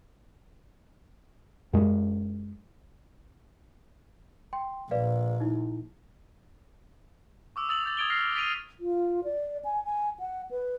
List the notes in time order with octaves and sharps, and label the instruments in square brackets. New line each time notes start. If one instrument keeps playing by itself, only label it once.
[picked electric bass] F#2 G#3
[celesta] G5 C6
[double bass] A#1 [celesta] B4 D5 F5
[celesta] D#4 E4
[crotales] C#6 D6 E6
D#6 E6 A6 F7 F#7
E6 G6 A6
D#6 G#6 A6 D7 F#7 G7
F6 A#6 C7
A6 B6 D7 D#7 F7 G7
[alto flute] F4
D5
G#5
G#5
F#5
B4